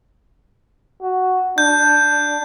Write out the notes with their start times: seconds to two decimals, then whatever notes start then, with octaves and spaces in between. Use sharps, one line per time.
1.02 F#4
1.58 D4 G6